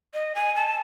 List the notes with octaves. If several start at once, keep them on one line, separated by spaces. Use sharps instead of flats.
D#5
G#5
A5